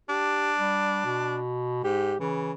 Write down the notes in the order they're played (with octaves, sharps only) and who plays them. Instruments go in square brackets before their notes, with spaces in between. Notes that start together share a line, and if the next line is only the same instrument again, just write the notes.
[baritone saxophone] D4 [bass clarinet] G4
[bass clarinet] G3
B2
[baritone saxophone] G#2 [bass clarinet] G4
[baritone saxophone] C#3 [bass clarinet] E3